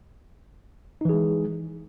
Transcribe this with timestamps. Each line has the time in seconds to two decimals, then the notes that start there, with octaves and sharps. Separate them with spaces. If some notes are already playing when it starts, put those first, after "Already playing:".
1.01 D#4
1.05 E3
1.09 G#4
1.13 G#3